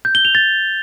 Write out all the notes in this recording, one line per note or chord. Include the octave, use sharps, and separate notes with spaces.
G6
G7
F7
A6